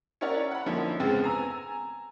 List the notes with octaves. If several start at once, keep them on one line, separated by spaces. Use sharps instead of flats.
C#4 E4 A#4 C#5 D5 F#5
F#5 B5
D3 F3 A#3 C#4 D#4 E4
F1 G#2 C#3 B3 C4 A6
G#5 A#5 E6